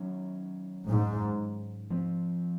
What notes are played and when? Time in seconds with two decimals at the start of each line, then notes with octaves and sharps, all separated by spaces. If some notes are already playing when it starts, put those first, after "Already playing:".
Already playing: D#3 F#3 C#4
0.88 G#2
1.90 F3 C4